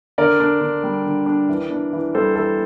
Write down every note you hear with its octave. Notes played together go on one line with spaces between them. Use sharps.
D3 A#4 D5
D4
D3
G3
D3
D4
E3
D4
E3
G3 A4 C5
E3 A4